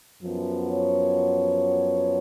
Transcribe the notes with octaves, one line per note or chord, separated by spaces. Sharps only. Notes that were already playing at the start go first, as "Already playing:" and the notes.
F#2 F3 B3
C#5